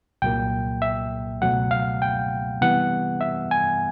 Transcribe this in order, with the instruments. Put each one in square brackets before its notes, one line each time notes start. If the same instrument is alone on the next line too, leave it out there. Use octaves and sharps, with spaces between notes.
[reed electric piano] C2 A#2 F#3 A#3 G5
E5
C#2 B2 F#3 A3 F#5
F5
G5
C3 E3 G3 B3 F#5
E5
G#5